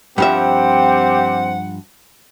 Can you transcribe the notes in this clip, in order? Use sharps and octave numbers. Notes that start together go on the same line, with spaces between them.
G2 F3 C4 G4 E5 F#5